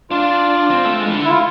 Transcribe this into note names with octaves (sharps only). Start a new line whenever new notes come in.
D4 F4
C4
A3
G#3
E3
D3
E4
F4